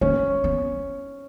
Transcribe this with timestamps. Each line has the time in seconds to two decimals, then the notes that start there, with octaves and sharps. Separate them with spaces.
0.01 A#3 C#4
0.44 B3